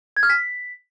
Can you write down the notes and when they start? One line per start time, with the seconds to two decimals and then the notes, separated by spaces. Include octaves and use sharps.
0.17 G#6
0.23 F6
0.29 B6